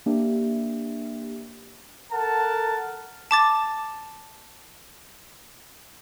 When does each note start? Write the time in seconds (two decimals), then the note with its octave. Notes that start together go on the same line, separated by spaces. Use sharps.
0.06 A#3 D4 G4 E5
2.13 A4 A#4 F#5 A5
3.31 A5 D6 A6